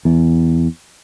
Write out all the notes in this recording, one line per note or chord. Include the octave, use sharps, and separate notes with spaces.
E2